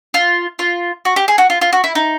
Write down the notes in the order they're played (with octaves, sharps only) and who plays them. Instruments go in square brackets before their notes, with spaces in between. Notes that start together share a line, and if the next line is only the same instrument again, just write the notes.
[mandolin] F4
F4
F#4
G4
G#4
F#4
F4
F4
F#4
E4
D#4